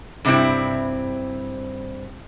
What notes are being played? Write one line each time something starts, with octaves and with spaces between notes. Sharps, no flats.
G2 C3 G3 C4 E4